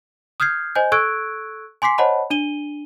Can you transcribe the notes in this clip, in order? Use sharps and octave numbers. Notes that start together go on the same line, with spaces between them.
D#6 F6 G6 G#6 C7
C5 D#5 G#5 G6
A4 C#6 E6 F#6 G#6 D7
G#5 C6 D6 B6 C7
C5 C#5 D#5 F#5 A5 B5
D4 D#7 G7